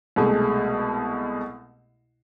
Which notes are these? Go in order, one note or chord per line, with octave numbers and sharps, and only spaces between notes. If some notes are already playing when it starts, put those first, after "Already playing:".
C2 B2 G#3 A3